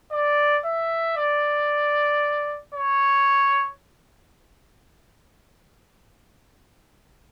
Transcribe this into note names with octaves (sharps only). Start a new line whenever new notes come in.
D5
E5
D5
C#5